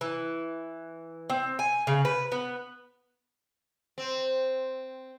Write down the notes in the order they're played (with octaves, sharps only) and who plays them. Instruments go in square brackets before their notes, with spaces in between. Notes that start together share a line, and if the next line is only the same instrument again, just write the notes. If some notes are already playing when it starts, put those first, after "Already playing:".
[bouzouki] E3
C4
G#5
C#3
B4
B3
[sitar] C4